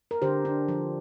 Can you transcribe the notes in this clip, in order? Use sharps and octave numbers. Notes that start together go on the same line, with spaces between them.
A#4
D3 G4 C5
D4
F3